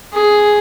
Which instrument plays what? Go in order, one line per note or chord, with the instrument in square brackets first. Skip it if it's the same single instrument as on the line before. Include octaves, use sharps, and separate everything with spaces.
[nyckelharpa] G#4